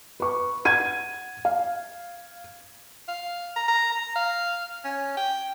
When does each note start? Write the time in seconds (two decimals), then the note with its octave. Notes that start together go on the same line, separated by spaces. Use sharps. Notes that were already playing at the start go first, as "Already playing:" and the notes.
0.20 B4 C#6
0.65 F#5 G#6 D#7
1.45 F5
3.08 F5
3.56 A#5
3.68 A#5
3.92 A#5
4.15 F5
4.85 C#4
5.17 G5